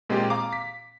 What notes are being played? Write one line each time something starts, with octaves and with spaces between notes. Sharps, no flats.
A#2 G#3 C4 F4 G4
F5 A#5 D6
B6